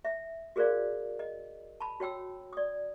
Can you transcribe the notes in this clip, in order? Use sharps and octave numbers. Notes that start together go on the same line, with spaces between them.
E5
F#4 G#4 A#4 C5 D5 F5
D#5
A5 B5
F#4 C#5 G5 E6
D5 D#6